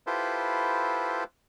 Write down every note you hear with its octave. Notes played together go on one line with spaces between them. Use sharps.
E4 F4 G4 A4 B4 C5